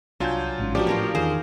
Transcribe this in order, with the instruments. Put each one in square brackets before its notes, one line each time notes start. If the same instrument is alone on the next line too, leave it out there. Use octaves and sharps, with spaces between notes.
[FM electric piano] C2 G#5 G6 [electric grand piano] F#3 F4 [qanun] D4
[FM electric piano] A1 G#2 C#4
[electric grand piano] F3 G4 D5 [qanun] F#3 D4 B4
[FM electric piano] A2 [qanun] F4 A#4 C#5
[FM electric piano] E2 D#3 [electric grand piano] G#4 [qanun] A#4 C5